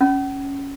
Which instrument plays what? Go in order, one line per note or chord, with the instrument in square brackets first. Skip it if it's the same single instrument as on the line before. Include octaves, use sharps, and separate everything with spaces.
[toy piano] C#4